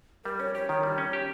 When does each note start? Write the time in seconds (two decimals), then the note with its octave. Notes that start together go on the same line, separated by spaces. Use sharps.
0.25 G3 A#4
0.40 C#4 C#5
0.55 G4 C#5
0.69 D#3 C#5
0.83 G3
0.98 C#4
1.13 G4